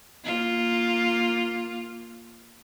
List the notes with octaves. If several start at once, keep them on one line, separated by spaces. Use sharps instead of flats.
A#3 F4